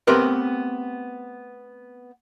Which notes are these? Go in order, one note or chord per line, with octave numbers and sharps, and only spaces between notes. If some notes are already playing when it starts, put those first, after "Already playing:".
A3 B3 C4 G4 A#4 B4